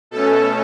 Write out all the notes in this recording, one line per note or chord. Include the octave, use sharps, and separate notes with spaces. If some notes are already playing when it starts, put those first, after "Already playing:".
B2 A3 C#4 A4